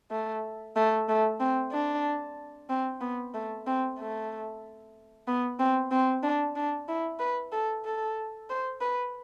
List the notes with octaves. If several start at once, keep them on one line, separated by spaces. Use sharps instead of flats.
A3
A3
A3
C4
D4
C4
B3
A3
C4
A3
B3
C4
C4
D4
D4
E4
B4
A4
A4
C5
B4